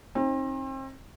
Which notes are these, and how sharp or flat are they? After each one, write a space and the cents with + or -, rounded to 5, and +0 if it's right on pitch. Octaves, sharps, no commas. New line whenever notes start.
C4 +35 D#4 +10